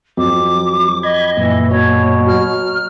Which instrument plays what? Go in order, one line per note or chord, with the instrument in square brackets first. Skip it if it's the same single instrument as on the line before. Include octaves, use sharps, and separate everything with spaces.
[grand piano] F2 [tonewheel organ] F#3 [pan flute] D6
[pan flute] D#5 [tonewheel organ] B5 G#6
[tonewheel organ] F#2 A#2 [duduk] E3
[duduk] B2 [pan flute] C#5
[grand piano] F#3 [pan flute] F6